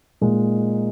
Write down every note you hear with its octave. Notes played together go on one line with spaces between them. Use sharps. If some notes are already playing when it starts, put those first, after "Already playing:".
A#2 G#3 D#4